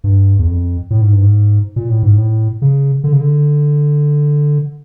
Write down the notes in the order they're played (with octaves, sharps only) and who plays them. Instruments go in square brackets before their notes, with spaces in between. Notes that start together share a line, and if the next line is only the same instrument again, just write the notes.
[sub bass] G2
E2
F2
A2
G#2
G2
G#2
A#2
A2
G#2
A2
C#3
D3
C#3
D3